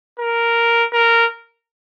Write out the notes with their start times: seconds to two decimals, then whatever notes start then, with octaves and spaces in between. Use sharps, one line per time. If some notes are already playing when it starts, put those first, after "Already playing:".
0.20 A#4
0.93 A#4